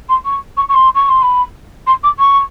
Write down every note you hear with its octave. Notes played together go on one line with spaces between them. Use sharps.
C6
C#6
C#6
C#6
C6
C#6
C6
B5
C6
D6
C#6